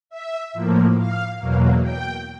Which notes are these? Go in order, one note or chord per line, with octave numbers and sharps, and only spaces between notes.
E5
A2 F3 A#3
F5
E2 B2 F#3 A#3
G5